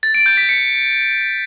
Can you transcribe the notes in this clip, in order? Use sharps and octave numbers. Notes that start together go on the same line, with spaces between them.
A6
D7
G6
B6
C#7